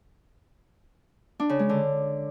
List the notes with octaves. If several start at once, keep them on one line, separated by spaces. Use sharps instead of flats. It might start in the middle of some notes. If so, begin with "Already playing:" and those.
D4
C#3
G#3
D3